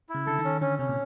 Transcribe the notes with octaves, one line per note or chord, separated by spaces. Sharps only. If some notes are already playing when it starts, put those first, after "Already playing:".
E4
C#3
D3 A4
D#3
C#4
D3 C#4
C3 C#4
A#2